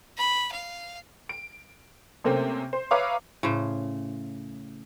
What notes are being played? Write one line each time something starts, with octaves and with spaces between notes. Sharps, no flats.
B5
F5
D7
C3 A3 A#3 C4 C#4
C5
B4 C#5 E5 F5 A#5 D6
A2 C#3 C5